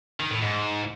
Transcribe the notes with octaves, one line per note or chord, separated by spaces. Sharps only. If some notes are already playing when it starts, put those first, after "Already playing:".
D#3
A2
G#2